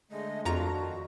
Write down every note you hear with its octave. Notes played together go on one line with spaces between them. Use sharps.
D3 G#3 A3 D#5
F2 D4 F4 F#4 A#4 A#5 A#6
D#3